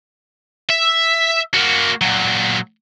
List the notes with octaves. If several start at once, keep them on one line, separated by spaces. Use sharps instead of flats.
E5
A#3 F#4
A#2 F#3